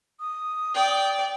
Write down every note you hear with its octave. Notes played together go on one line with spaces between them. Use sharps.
D#6
D5 G5